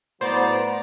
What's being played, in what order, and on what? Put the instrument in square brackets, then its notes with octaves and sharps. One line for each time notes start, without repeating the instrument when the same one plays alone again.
[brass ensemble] A2 F#3 B3 [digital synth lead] C5 [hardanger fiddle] D5 A#5